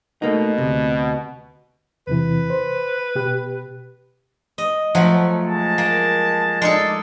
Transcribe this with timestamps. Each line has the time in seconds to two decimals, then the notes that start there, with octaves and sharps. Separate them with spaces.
0.22 B2 A3 A#3 D#4
0.58 D2 C3
2.07 E2 C3 E3 B4
2.50 C5
3.15 B2 G4 F#6
4.58 D#5
4.95 F3 F#3 A3
5.45 G#3 A5
5.78 A#3
6.62 G#3 D#4 A4 D5